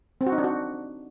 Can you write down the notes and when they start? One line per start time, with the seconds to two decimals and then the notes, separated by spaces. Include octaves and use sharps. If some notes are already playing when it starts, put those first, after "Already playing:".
0.21 C4
0.26 F#4
0.32 D#4
0.38 D4
0.44 F#4